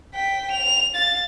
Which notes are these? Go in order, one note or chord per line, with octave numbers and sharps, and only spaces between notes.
G5 B6
F7
F5 A6